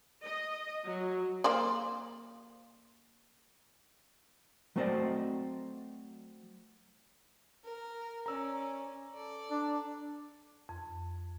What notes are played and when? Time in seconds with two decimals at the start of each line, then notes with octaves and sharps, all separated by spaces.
0.23 D#5
0.84 F#3
1.44 A#3 C5 D5
4.76 F#3 A3 C4 C5 D5 D#5
7.64 A#4
8.26 C#4 D5 A#5 E6
9.14 A4 D5
9.51 D4
10.69 F2